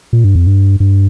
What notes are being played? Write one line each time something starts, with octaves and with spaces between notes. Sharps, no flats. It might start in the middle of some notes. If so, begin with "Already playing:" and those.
A#2
G2
F2
G2
G2